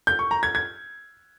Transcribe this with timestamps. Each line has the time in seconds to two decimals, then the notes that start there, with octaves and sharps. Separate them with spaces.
0.07 G6
0.19 C#6
0.31 A#5
0.43 G#6
0.55 G#6